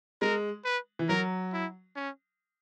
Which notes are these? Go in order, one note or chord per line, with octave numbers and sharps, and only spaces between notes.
G#3 A#4
B4
E3
F#3 A#4
E4
C#4